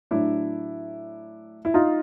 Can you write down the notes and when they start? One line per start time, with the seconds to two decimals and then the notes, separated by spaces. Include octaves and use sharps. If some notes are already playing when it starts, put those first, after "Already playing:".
0.11 A2 F#3 A3 D4 E4
1.65 E4
1.74 D#4 F4